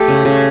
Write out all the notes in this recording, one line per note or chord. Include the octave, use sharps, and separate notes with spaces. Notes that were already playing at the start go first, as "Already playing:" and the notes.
Already playing: A3 G4 A4
C#3
C#3